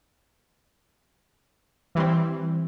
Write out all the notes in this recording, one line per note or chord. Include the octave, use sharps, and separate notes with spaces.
E3 G3 C4